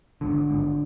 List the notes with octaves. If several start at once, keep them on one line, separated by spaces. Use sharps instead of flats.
G#1 G#2 D3
G#1 G#2